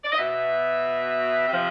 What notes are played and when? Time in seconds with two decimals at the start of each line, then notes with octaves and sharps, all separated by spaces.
0.04 D5
0.12 D#5
0.18 B2 E5
1.48 C3 F3